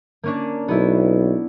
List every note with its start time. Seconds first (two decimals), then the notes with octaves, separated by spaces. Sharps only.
0.23 A#3 C#4 D4
0.68 B1 B3 E4